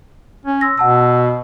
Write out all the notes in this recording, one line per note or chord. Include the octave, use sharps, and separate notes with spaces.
C#4
C6 E6 A#6
B2 F#5 A5 E6